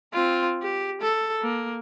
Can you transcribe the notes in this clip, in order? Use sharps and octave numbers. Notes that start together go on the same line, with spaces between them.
C4 F4
G4
A4
A#3